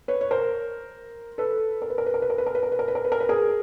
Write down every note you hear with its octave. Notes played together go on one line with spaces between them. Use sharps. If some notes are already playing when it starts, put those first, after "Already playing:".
B4 C#5
C#5
A#4 C5
A4 B4
A#4
B4
A#4
B4
A#4
B4
A#4
B4
A#4
B4
A#4
B4
A#4
B4
A#4
B4
A#4
B4
G#4 A#4